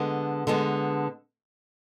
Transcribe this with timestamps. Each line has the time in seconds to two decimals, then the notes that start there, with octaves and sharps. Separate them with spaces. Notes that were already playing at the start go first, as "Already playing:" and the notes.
Already playing: D3 G#3 B3
0.47 D3 G#3 B3